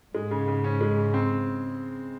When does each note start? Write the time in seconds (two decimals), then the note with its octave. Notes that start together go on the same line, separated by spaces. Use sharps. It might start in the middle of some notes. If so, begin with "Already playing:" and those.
0.14 G#2 G#3
0.31 C#3
0.48 C#3
0.64 C#4
0.81 G#3
0.97 C#3
1.14 C4